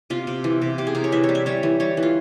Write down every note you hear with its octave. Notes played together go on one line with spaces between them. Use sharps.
C3 F4
C3
E3
C3
C3 G4
G#4
C3 A#4
C#5
E3 E5
C#5
G3
E5
G3 C#5
E3
G3 C#5
E3
F4